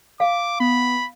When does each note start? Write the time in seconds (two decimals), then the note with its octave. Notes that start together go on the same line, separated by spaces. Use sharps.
0.20 F5 D6
0.60 B3 B5